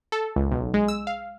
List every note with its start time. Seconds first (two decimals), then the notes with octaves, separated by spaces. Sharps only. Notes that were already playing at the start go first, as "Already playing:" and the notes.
0.12 A4
0.36 C#2
0.51 B1
0.74 G#3
0.88 E6
1.07 F5